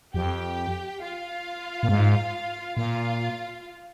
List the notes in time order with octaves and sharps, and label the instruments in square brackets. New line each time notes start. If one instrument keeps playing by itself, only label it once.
[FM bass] F2 [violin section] G4 G5
[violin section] F4 F5
[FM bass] A#2
G#2
[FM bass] A#2 [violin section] F4 F5